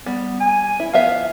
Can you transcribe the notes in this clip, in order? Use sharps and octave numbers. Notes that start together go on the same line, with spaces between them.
G3 B3
G#5
E4
F3 B3 E5 F5